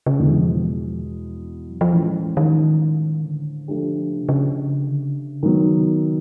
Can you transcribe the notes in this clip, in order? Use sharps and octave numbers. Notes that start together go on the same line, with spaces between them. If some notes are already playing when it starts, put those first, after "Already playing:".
C#3
E2 B2 D3 G#3 B3
E3
F3
E3
F#3
F3
A2 E3 F3 G#3 C#4
D#3
D3
F3 A3 D4 G4
C#3
C3
C#3
D3
C#3
D#3 F#3 B3
C3
C#3